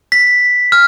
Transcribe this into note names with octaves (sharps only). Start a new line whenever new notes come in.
B6
F6